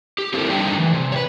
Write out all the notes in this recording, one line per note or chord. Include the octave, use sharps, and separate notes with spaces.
G4
C4 E4 F4 A4 A#4
G3 A3 D4 D#4 G5
E3
C3
B4 C#5